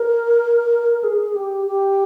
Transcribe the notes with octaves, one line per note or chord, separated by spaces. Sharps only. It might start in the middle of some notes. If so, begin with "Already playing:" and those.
Already playing: A#4
G#4
G4
G4